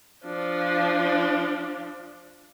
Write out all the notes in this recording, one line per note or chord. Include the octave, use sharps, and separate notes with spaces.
F3 D4